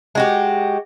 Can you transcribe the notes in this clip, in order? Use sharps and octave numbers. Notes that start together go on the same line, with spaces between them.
G#3 F#4 G4